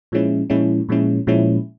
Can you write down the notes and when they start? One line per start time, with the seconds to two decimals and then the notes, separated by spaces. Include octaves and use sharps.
0.12 A#2 F3 G#3 C#4 E4
0.50 A#2 F3 G#3 C#4 E4
0.89 A#2 F3 G#3 C#4 E4
1.27 A#2 F3 G#3 C#4 E4